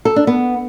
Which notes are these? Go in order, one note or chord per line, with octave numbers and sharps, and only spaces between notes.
A4
D4
B3